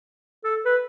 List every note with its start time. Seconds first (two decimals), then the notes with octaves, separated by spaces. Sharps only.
0.44 A4
0.65 B4